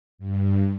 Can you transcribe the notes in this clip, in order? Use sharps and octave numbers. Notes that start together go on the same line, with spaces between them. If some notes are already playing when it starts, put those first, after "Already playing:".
G2